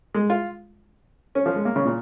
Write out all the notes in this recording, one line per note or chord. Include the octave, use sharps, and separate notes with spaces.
G#3
F4
C#4
F3
G#3
A#3
C#3
A#2